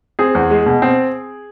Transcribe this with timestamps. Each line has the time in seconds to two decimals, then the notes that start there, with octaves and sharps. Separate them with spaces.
0.19 C4 G#4
0.35 E2
0.51 G#3
0.66 B2
0.82 C4